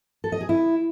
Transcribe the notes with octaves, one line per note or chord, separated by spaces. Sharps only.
A4
D#5
G#4
E4